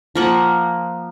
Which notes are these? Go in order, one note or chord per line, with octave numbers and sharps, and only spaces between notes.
F3 A#3 F#5